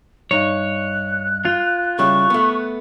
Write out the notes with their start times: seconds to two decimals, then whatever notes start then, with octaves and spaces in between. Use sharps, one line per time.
0.31 G2 D#4 C#5 F#6
1.45 F4
1.99 C#3 G3 E4 C#6
2.30 A3 B3